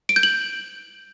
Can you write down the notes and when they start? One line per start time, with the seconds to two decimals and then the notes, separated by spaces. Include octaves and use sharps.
0.09 D7
0.16 G6
0.23 F#7